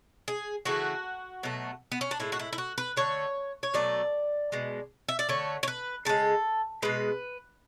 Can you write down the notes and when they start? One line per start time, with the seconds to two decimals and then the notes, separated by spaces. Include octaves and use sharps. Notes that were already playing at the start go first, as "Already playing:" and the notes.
0.28 G#4
0.65 C#3 E3 A3 F#4
1.43 B2 F#3 A3
1.92 B3
2.01 C#4
2.11 D4
2.20 A2 G#3 E4
2.32 F#4
2.39 E4
2.53 E4
2.58 F#4
2.78 B4
2.97 D3 A3 C#5
3.63 C#5
3.74 B2 F#3 A3 D5
4.52 B2 G#3
5.09 E5
5.19 D5
5.29 D3 A3 C#5
5.63 C#5
5.68 B4
6.05 C#3 G#3 A4
6.82 B2 G#3 B4